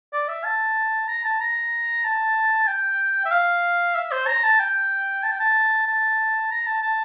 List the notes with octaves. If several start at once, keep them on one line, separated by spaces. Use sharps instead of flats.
D5
E5
A5
A#5
A5
A#5
A5
G5
E5
F5
E5
C5
A#5
A5
G5
A5
G5
A5
A5
A#5
A5
A5